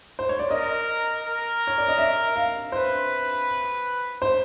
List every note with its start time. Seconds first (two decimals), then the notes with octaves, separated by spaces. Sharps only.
0.19 C5
0.29 C#5
0.39 D5
0.50 A#4 D#5
1.24 A#4
1.67 C#5
1.78 D5
1.88 D#5
1.98 E5
2.36 F5
2.72 B4 C5
4.22 C5